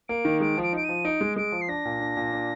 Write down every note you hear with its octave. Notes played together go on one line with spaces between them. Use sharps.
A#3 D7
D#3
G#3 D7
F3
D7
D#4 D7
D#7
F3
D#4 D7
G#3
G#3 D7
F3
C7
D4 A#6
A#2
D4
A#2
D4